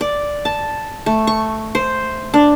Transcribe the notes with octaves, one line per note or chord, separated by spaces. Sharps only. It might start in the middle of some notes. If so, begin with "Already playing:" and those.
D5
A5
A3
C#6
C5
D4